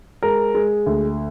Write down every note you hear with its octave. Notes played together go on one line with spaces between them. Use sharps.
G#3 A#4
G#3
D2